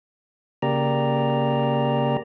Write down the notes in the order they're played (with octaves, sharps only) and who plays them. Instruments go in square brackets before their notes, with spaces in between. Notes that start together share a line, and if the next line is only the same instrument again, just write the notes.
[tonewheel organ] C#3 A#3 G4 D5 A#5